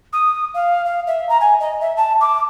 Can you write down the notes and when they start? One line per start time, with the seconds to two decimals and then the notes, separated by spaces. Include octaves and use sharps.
0.13 D#6
0.54 F5
0.85 F5
1.07 E5
1.29 A#5
1.41 G#5
1.60 D#5
1.81 E5
1.96 A5
2.21 D6